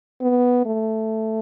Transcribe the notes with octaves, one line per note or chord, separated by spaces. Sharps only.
B3
A3